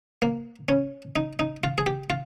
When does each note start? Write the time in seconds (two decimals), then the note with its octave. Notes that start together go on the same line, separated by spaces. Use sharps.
0.22 A#3
0.69 C#4
1.16 D#4
1.39 D#4
1.64 F4
1.78 G#4
1.86 G4
2.10 F4